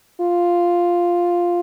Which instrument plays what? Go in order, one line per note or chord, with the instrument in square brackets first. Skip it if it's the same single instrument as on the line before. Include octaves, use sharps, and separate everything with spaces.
[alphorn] F4